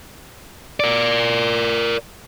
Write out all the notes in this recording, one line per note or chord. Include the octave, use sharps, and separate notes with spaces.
A#4 D5